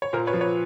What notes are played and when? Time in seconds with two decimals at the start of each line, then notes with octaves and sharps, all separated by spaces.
0.02 C#5
0.13 A#2 A#4 C5
0.27 B4 C#5
0.33 F3
0.41 B4 C#5